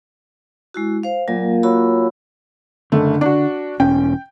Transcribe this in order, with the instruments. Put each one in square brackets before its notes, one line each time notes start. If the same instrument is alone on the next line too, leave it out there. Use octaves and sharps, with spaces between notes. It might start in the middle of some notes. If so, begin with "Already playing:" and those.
[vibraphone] G#3 E4 F#4
C5 F5
[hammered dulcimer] A#2 [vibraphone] F#3
[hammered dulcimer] F#3 [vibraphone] F#4 B5 E6
[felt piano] F#1 A3 [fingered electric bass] D3
[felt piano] D4 F#4
[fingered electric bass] E1 C#4 [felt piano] G5